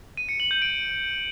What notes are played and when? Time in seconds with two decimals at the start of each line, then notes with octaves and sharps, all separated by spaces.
0.17 D#7
0.29 C#7
0.40 F#7
0.51 G6
0.62 D7